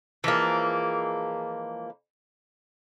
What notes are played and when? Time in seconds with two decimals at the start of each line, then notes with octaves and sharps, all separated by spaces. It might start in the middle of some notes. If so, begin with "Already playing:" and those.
0.24 E3 F3 G#3 A#3